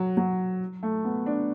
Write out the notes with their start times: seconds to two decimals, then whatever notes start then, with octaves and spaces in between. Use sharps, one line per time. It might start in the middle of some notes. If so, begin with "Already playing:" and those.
Already playing: F#3
0.17 F#3
0.83 A3
1.04 B3
1.26 D4